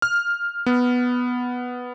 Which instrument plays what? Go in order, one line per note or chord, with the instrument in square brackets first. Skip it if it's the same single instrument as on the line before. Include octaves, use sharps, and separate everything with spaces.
[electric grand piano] F6
B3